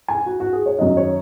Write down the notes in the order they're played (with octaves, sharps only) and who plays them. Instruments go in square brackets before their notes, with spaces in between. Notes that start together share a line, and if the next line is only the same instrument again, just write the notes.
[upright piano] G#5
F#4
F#4
G#4
C#5
F#2 D#3 D#5
C#5